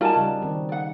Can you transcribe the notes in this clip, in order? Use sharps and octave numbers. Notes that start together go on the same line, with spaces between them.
G3 D#4 F4 F#4 A#4 D5 G#5 A5
C#3 G3
D#3 C4
D5 F#5